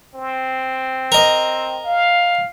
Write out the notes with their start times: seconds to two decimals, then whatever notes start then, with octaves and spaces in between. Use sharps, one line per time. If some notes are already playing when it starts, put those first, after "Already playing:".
0.15 C4
1.12 A#4 D#5
1.85 F5